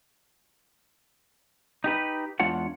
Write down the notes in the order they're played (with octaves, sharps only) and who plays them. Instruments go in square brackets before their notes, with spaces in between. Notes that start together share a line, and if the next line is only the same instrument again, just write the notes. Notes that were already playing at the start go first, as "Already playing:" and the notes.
[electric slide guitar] D#4 G4 B4
E2 G#3 D4 F4 C#5 F#5